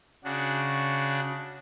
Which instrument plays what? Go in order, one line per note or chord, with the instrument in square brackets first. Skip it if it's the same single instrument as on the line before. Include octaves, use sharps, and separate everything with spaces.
[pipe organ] C#3 D4 F#4